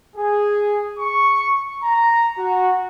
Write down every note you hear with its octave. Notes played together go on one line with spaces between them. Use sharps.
G#4
C#6
A#5
F#4